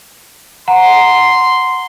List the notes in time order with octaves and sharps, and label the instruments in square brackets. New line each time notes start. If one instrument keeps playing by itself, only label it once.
[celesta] F#5 A#5 [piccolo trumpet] C6